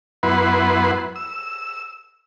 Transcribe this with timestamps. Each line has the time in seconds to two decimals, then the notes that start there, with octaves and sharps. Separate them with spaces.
0.23 F#2 B3 E4 B4 F#5 C6
1.16 E6